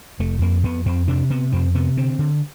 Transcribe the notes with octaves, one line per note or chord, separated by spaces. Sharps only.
F1 A3
F2 A#3
F2 B3
F2 C4
C3 D4
C3 B3
F2 C4
C3 B3
D3 C4
D3